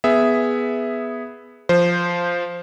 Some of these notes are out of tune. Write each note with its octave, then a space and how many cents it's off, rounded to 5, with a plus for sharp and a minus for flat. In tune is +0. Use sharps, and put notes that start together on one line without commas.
B3 +0 G#4 +0 E5 +0
F3 +0 C5 +0